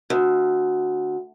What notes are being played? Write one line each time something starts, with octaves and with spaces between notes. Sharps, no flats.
D2